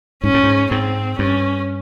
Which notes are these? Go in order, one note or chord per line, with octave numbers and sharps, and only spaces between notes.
G#2 C#4
A2
G#2
G#2 C4
G2 C#4